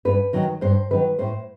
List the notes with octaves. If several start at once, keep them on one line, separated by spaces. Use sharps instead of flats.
G2 B4
D#3 F#3
G2 C5
D#3 F#3 B4
A2 C5